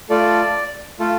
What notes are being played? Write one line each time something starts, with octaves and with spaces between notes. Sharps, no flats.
A3 F4 A4 D5
A3 F4 A4